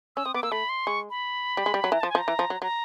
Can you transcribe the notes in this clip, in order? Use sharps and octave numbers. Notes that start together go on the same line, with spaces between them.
C#4 E6
C4 D#6
B3 D6
A#3 E6
A3 B5
C6
G#3 C#6
B5
G3
G#3
G3
F#3
E3 A#5
F3 A5
G#5
F3
A#5
E3
F3
F#3
F#3 A#5